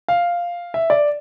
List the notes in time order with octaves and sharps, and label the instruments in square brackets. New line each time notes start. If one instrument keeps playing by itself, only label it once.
[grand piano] F5
E5
D5